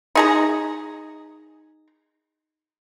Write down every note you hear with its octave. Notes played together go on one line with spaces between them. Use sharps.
D#4 G#4 A#5